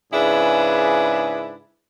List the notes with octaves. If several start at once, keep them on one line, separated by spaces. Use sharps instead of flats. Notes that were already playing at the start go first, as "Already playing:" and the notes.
G#2 C#3 D4 E4 G#4 B4